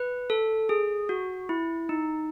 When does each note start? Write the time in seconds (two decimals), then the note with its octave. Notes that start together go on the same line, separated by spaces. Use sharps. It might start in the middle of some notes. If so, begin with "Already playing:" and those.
Already playing: B4
0.30 A4
0.69 G#4
1.09 F#4
1.49 E4
1.89 D#4